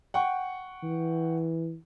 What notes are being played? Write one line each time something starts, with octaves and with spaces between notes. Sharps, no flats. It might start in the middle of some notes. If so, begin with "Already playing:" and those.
F#5 G5 C#6
E3